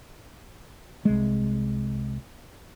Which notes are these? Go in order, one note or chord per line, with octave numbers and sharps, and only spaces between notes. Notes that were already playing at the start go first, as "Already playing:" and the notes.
C2 G#3